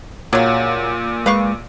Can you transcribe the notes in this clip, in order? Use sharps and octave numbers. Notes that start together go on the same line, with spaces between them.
A#2 C#3 F#3
G#3 B4 F5 C#6